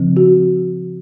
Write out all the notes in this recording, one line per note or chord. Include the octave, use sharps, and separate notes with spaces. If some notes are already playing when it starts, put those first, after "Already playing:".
Already playing: C#3 F3 C4
F#4